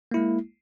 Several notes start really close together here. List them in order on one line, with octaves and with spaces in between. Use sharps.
A#3 E4 G#3